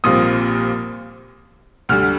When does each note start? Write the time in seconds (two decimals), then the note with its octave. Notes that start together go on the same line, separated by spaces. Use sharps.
0.04 A#1 A#2 G3 C4 F4 D#6
1.89 D2 D3 G3 F6